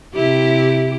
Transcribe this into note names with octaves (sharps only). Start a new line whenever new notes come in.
C3 E4 G4